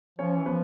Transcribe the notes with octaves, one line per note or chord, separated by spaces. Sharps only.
F3 C#4 C#5
E3
F3 B3 B4